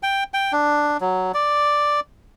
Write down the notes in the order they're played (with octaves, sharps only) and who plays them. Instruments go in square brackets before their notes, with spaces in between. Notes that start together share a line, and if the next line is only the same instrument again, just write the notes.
[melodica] G5
G5
D4
F#3
D5